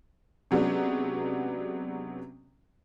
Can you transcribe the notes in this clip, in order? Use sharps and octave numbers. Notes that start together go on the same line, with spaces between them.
C3 F#3 G#3 B3 C#4 D4